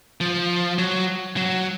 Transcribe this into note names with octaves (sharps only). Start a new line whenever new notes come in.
F3
F#3
F#3